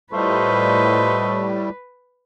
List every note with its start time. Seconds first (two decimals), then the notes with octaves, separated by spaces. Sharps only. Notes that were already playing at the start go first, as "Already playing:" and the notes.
0.13 A2 G3 A3 F4 B4 C5 D#5